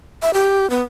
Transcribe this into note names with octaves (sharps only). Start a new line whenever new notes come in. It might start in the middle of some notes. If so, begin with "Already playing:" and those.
E5
G4
B3